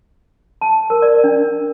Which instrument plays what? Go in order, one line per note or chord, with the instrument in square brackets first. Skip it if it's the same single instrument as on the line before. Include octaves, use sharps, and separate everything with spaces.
[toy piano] A5
A#4
D5
D4